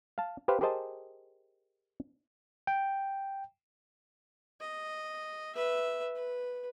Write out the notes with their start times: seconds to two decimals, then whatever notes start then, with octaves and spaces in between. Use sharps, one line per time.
0.18 F5 A5
0.48 G4 B4 C5 F5
0.61 G4 G#4 A#4 C5 D#5 A5
2.67 G5
4.60 D#5
5.55 B4 E5
6.16 B4